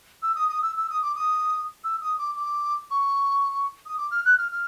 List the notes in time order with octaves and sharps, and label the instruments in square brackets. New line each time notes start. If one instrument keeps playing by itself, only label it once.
[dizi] E6
D#6
D#6
E6
E6
D#6
D6
D#6
E6
D#6
D6
D6
C#6
D#6
D6
F6
F#6
F6
F6